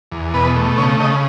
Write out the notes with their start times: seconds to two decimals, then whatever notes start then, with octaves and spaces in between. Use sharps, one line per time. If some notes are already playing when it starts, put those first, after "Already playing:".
0.12 E2
0.34 B2 B4
0.56 A3
0.78 C#3 C#5
1.00 C#3 D#5